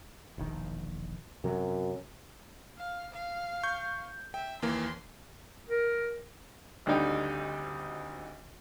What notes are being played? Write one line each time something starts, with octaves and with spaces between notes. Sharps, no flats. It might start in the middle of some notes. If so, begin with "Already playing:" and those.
E1 A#1 D#3
F#2 C3 F#3
F5
F5
C#6 G6
E5 G5
D#2 E3 A#3 C6
A#4
G#1 D2 D3 G3 D#4 G5